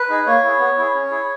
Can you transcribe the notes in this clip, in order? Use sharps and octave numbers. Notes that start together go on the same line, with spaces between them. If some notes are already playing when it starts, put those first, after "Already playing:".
Already playing: B4
D#4 G#4
A#3 C#5
E4 G#4
B3
E4 G#4
C#4
E4 G#4